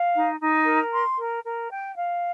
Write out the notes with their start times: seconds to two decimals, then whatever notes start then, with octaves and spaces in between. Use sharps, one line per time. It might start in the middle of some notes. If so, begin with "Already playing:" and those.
Already playing: F5
0.13 D#4
0.39 D#4
0.65 A#4
0.91 C6
1.17 A#4
1.42 A#4
1.70 G5
1.95 F5